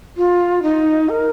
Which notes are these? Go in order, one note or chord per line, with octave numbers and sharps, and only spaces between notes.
F4
D#4
A#4